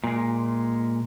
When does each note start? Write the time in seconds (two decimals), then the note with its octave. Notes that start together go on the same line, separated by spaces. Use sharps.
0.04 A#2 G#3